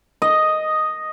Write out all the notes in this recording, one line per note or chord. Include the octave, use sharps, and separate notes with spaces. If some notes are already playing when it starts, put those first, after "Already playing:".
D#5